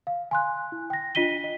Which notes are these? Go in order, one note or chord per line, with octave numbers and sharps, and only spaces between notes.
F5
G#5 C6 F#6
E4
G5 A#6
D4 F4 D#5 B6 D#7 G7
D#5